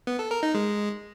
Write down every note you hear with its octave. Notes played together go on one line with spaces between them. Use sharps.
B3
A4
A#4
D#4
G#3